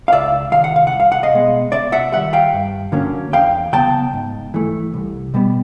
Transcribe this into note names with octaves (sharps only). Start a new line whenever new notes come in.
F5
C#2 D5 E5
C3 D#3 F5
F#5
F5
F#5
C2
F5
F#5
D#5 F5
B2 G#3 B3
C3 D5 E5
E5 F#5
D#3 G3 E5 F#5
F5 G5
G2
D3 F#3 A#3 C#4
E2 F5 G5
C#3 F#3 B3 G5 A5
G#2
E3 A3
C2
B2 G3 B3